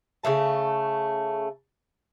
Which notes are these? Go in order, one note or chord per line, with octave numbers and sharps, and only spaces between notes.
C#3 G#3 A3 A5